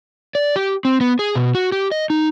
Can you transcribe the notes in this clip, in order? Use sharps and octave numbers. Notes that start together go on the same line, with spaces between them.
D5
G4
C4
B3
G#4
B2
F#4
G4
D#5
D#4